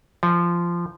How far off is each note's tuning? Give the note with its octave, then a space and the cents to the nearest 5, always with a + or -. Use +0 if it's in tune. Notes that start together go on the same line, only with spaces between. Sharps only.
F3 -15